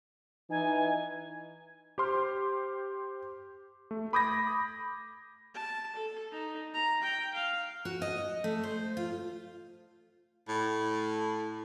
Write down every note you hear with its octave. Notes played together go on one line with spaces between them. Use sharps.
E3 D#4 G#5
G4 C5 C6 F6
A3
B5 D6 D#6 G6 G#6 A#6
A5
A4
D#4
A#5
G5
F5
F#4
D#5
A3
C5
F4
A2